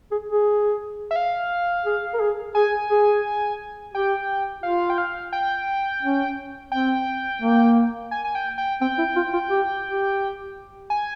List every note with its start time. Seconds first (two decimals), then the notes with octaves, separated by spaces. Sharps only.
0.11 G#4
0.29 G#4
1.11 E5
1.16 F5
1.86 G#4
2.14 A#4
2.20 G#4
2.55 G#4 G#5
2.90 G#4
3.94 G4 G5
4.63 F4 F5
4.90 G5
4.98 F5
5.32 G5
6.03 C#4
6.72 C4 G5
7.42 A#3
8.11 G#5
8.24 G#5
8.35 G5
8.58 G5
8.81 C4 G5
8.98 E4
9.16 F4
9.33 F4
9.50 G4
9.85 G4
10.90 G#5